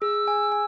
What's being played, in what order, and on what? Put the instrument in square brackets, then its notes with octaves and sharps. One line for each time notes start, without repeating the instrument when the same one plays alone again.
[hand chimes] G#4 [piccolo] E6
[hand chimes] G#5
G#5